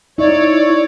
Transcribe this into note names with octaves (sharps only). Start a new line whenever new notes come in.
D#4 E4 C#5 D5